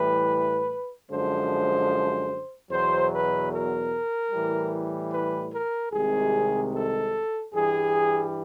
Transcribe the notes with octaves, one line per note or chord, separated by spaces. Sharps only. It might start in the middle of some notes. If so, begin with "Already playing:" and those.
Already playing: A2 E3 G3 B4
F#2 D3 F3 G#3 C5
E2 B2 F#3 C5
B4
A#4
A2 E3 G3
B4
A#4
C2 C3 D#3 G#3 G#4
A4
G2 E3 G3 G#4